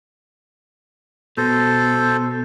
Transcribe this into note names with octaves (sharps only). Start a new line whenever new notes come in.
B2 A4 C5